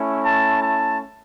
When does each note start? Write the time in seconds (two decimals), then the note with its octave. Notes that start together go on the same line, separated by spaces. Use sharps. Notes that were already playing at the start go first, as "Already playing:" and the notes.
Already playing: A3 C#4 E4
0.23 A5
0.63 A5